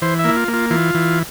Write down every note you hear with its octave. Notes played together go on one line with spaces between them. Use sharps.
E3 C5
E5
A#3 E4
F4
A#3
F4
E3 F4
E3